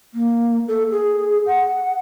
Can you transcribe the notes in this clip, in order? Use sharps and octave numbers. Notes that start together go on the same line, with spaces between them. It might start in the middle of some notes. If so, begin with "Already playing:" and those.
A#3
A4
G#4
F#5